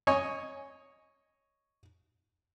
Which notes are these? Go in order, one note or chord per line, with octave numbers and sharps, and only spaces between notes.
C#5 D#5 G#5 C#6